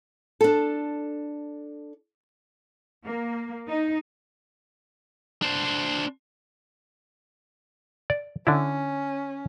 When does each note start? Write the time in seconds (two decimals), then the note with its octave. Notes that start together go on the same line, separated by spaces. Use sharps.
0.41 D4 A4
3.05 A#3
3.68 D#4
5.42 D4 C5
8.10 D5
8.47 D3 C#4 D4 E4